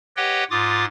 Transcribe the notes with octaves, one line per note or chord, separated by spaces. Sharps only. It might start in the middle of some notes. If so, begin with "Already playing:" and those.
G4 B4 C#5 D#5 F#5 G5
G#2 F4 D6 D#6 A6